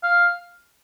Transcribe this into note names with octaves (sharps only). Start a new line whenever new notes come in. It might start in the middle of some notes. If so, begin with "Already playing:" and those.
F5